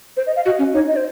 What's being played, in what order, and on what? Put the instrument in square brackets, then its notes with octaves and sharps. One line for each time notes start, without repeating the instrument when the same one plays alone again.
[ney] C5
D#5
F5
[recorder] F#4 [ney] D#5
[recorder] C#4
[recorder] D#4 [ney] C#5
[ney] D#5
C5